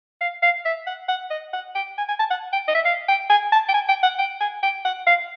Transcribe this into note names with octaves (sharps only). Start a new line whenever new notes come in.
F5
F5
E5
F#5
F#5
D#5
F#5
G5
G#5
G#5
A5
F#5
G5
D#5
E5
F5
G5
G#5
A5
G5
G#5
G5
F#5
G5
G#5
G5
F#5
F5